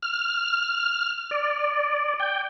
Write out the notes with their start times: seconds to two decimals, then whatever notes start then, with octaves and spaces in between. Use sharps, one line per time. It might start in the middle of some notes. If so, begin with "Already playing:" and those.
0.03 F6
1.31 D5
2.20 G5